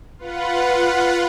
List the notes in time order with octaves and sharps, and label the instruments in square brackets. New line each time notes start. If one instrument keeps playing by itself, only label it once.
[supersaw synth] F4 B4 F#5